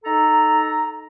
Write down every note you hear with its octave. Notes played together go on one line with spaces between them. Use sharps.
D#4 A4 A#5